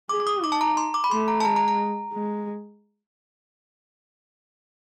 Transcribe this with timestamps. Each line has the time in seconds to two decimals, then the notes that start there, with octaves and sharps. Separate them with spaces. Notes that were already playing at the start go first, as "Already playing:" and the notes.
0.09 G#4 D6
0.20 D6
0.27 D#6
0.43 D#4 D6
0.52 A5
0.61 A#5
0.77 C6
0.94 D6
1.04 B5
1.11 A3 C6
1.28 A#5
1.40 A5
1.45 G#3 A#5
1.56 A#5
1.68 A#5
2.13 G#3